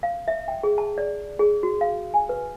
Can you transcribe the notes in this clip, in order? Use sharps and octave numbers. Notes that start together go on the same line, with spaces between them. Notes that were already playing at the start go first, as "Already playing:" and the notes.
F5
E5
G5
G#4
A5
D5
G#4
F#4
F5
G#5
B4